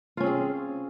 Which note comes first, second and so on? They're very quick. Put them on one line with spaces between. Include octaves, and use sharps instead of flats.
F4 C#4 C4 G#4